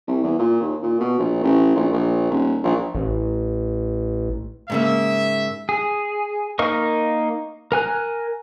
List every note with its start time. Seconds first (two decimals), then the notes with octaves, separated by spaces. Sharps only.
0.08 C2
0.23 E2
0.39 A#2
0.62 D#2
0.83 A#2
1.00 B2
1.19 A#1
1.43 A1
1.76 A#1
1.93 A#1
2.31 D#1
2.64 A#1
2.95 A1
4.70 G#2 C#3 A#3 E5
5.69 G#4
6.59 A#3 D#4 A#4 D#5 C#6
7.72 A#4 G#5 F#6